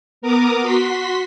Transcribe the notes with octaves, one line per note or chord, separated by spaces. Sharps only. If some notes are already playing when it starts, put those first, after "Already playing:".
B3 A#4 A#5 D6 D#6
F#4 C6 B6